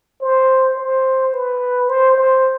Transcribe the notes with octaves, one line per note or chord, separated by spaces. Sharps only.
C5
C5
B4
C5
C5